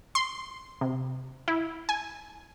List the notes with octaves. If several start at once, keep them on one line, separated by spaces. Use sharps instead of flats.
C6
C3
E4
G#5